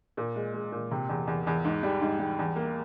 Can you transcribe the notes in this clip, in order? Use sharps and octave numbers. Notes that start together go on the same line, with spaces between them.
A#2
G#3
G#3
A#2
C3
E2
E2
E2
G#2
G3
G#2
G3
E2
A#3